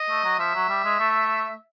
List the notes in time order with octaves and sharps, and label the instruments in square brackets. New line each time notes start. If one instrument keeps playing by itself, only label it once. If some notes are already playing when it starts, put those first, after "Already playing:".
Already playing: [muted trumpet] D#5
[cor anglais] A3
F#3
[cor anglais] F3 [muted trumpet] E5
[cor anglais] F#3
G3
G#3
A3